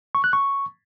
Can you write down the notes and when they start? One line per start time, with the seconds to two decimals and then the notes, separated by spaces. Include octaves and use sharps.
0.15 C#6
0.24 F#6
0.33 C#6